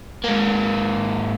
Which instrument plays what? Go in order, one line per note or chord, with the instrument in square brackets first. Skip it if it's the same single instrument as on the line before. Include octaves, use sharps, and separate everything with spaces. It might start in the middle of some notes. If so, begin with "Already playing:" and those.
[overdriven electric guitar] G#2 A#3